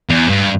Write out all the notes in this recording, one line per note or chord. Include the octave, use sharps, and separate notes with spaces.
E2
G2